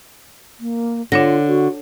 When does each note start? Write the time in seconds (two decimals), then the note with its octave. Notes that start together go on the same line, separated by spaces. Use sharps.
0.60 A#3
1.12 D3 D4 F4 C#5 A#6
1.48 F#4